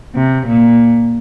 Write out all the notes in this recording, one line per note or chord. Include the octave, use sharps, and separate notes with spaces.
C3
A#2